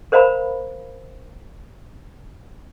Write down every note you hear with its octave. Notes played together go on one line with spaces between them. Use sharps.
A#4 C5 D#5 F5 A#5 B5